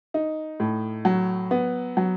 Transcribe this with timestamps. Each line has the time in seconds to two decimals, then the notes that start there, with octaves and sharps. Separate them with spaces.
0.14 D#4
0.60 A2
1.05 F#3
1.51 B3
1.97 F#3